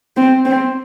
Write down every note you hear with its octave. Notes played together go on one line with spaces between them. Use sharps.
C4
C4